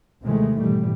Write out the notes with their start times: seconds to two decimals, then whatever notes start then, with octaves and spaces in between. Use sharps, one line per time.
0.22 D#2 C3 D#3 E3 G#3 A3
0.60 G#2 B2 E3 G3